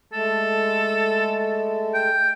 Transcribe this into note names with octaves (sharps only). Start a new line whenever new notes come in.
G#3 A3 A4
G5